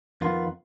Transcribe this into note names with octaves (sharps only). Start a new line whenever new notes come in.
F2 D#3 B3 F4